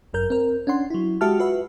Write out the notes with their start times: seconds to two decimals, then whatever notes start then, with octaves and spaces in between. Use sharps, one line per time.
0.13 G1 F#2 A#4 G6
0.30 C4 A#4
0.67 C#4 D4 F#5 C6
0.90 F#3 E4
1.21 G#3 F#4 G4 E5 A5 F6
1.39 F4 F#4 B4 E5